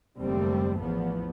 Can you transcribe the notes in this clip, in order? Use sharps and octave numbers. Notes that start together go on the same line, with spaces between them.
F#1 D#2 G3 A3 C4
A1 E2 F3 B3